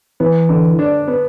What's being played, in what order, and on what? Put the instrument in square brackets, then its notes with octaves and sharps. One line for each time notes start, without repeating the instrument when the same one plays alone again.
[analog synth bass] E3 [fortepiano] B3
[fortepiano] D3
D4
B3